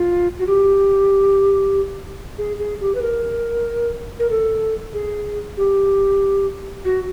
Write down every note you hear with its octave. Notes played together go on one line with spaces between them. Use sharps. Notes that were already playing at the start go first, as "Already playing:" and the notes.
Already playing: F4
F#4
G4
G#4
G#4
G4
B4
A#4
A#4
A4
G#4
G4
F#4